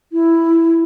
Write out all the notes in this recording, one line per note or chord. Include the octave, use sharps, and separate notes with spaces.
E4